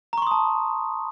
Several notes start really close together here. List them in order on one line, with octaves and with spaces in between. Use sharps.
A#5 C#6 C6 D#6 A5